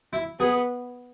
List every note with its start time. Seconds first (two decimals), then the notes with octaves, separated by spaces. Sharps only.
0.13 E4
0.40 B3 G#4